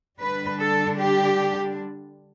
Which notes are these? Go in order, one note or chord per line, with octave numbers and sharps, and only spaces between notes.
D3 G3 D4 B4
A4
G4